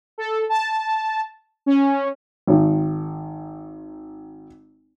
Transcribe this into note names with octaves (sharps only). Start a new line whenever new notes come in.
A4
A5
C#4
G#1 D#3